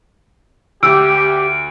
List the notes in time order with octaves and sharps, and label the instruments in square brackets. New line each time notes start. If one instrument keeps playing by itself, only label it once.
[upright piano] D2 [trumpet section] G4 [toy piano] E6 [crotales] D7